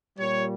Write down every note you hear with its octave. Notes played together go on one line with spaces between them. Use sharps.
A#2 G3 C#5